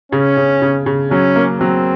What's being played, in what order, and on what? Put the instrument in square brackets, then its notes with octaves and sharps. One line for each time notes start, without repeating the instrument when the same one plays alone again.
[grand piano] C#3 [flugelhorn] C#4
[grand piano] C#3
C#3
C#3
[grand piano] F#3 [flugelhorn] C#4
[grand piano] A#3
[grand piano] F#3 [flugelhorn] C4